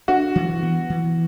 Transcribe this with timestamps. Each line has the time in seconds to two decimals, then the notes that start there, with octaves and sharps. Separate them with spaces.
0.08 D4 F#4
0.36 E3
0.63 B3
0.90 E3